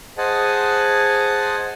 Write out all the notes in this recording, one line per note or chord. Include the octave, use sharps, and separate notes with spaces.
G#4 C5 D#5 F#5 G#5 A5